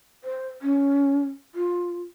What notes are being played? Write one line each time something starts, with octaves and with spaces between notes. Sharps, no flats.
C5
C#4
F4